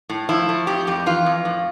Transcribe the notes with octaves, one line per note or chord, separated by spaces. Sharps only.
A2
F3 E4
A3
F2 G4
F2 G4
E3 F4
F2
A2